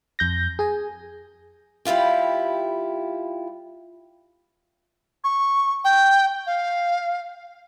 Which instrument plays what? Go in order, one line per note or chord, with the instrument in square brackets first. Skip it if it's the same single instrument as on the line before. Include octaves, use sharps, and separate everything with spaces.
[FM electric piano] F2 G6 A#6
G#4 G#5
[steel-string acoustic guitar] G3 E4 F4 G4
[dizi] C#6
G5
F5